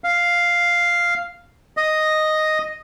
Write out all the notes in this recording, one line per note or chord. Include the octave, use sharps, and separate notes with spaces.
F5
D#5